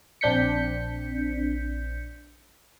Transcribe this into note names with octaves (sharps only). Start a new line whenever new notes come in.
A#1 C4 D4 G6 B6 C#7